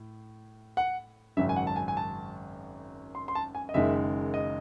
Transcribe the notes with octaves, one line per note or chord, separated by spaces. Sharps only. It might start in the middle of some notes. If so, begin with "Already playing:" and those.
Already playing: A2
F#5
G#1 F#2 C#3 F#3 E5
G#5
F#5
A5
G#5
G#5
A5
C6
C6
A5
G#5
D#5
F#1 F#2 D#3 G#3 E5
D#5